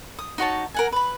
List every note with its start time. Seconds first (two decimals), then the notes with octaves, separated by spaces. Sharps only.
0.19 D#6
0.38 D#4 F#4 C#5 A5
0.74 A#4 F#5 G#5
0.92 B4 B5